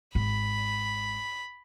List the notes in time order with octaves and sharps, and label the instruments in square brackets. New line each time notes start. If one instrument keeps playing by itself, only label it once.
[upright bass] G#1 [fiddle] B5